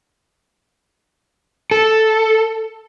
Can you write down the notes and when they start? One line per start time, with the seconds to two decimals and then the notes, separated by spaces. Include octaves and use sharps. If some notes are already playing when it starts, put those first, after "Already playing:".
1.71 A4